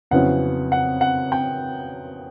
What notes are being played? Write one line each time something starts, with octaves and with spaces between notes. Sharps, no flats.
F2 C#3 F#3 B3 E4 F#5
F#5
F#5
G5